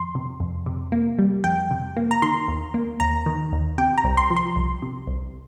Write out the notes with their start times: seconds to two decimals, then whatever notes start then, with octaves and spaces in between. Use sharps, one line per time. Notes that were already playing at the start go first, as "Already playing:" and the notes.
Already playing: F2 C6
0.15 C3
0.40 F2
0.66 C3
0.92 A#3
1.19 G3
1.44 F2 G5
1.71 C3
1.97 A#3
2.11 A#5
2.22 D#3 C6
2.48 D#2
2.74 A#3
3.00 D#2 A#5
3.26 D#3
3.52 D#2
3.78 C3 G5
3.98 A#5
4.04 C2
4.17 C6
4.30 F3
4.36 C6
4.56 C2
4.82 C3
5.07 C2